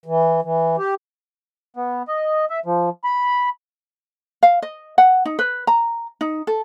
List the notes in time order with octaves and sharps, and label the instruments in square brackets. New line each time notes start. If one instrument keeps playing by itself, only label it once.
[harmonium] E3
E3
G4
[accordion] B3
D#5
E5
F3
B5
[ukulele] F5
D#5
F#5
D#4
B4
A#5
D#4
A4